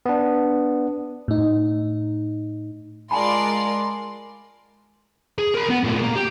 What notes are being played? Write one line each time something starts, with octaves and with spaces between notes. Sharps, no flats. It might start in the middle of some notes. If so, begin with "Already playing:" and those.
B3 D4
A2 D#4
G#3 F4 A#4 D5 G#5 A5 B5 C6
G#4
A#4 B5
B3
A#2 A3
A#3
G4